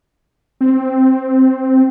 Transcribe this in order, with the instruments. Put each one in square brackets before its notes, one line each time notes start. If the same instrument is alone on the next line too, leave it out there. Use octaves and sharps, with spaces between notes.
[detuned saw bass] C4